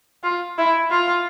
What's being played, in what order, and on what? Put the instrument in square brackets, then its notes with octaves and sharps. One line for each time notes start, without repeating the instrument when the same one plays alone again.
[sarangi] F4
E4
F4